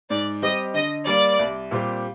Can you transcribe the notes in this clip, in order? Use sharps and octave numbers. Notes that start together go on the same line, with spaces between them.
G#2 D5
G3 C4 G4 D#5
D3 D#5
G3 A#3 D5
C2
A#2 G3 C4 G4